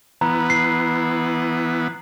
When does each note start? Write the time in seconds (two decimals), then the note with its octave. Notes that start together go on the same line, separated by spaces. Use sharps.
0.21 E3 B3 A#5
0.50 C7